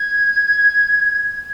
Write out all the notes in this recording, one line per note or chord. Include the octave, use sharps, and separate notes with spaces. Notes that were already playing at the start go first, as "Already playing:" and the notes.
Already playing: G#6